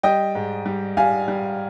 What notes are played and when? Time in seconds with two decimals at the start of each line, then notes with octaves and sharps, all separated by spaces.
0.03 G3 D#5 G5
0.35 G#2
0.66 G3
0.97 G3 F5 G#5
1.28 G3